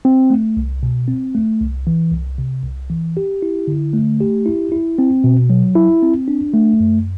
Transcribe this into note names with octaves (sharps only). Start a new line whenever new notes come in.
C4
A3
C2
B2
C4
A3
C2
E3
C2
C3
C2
E3
G4
E4
D3
A3
G4
E4
E4
C4
B2
F#3
E4
C4
D4
A3
F#2